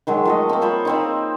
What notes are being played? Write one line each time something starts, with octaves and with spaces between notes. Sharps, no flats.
D#3 F#3 G#3
F3 A3 D#5
A#3 C4
F4 C5 C#5 B5
A#3 C4 D#4